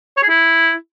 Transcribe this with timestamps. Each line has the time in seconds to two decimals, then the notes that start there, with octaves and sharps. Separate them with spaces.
0.17 C#5
0.23 G#4
0.29 E4